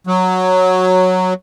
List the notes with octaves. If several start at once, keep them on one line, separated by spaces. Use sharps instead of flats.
F#3